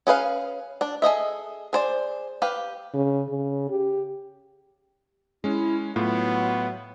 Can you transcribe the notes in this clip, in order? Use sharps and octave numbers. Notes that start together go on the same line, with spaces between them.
C#4 G#4 B4 F5
D4 D5
G#4 A4 D#5 E5
G#4 C5 D5
G4 B4 F5
C#3
C#3
G4
G#3 C#4 E4
A2 F#3 B3 F4